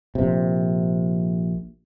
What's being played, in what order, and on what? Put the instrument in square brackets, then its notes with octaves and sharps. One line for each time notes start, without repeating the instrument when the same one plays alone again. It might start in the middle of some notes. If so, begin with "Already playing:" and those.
[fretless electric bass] A#1 C3